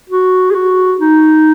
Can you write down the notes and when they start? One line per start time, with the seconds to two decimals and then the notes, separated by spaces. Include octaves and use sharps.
0.10 F#4
0.51 G#4
0.55 F#4
1.00 D#4